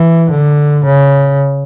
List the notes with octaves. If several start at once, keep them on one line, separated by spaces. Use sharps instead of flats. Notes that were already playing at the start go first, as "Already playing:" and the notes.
Already playing: E3
D3
C#3